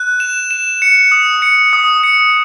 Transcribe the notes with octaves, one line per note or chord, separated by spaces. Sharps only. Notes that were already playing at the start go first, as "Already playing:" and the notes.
Already playing: F#6
E7
E7
C#7
D#6
C#7
D#6
C#7